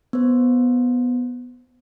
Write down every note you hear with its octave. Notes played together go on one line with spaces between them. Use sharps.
B3 C5